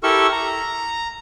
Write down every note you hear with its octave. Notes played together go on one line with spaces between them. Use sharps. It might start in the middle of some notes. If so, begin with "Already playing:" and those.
E4 G4 A4 A#4 C#6 E6
A#5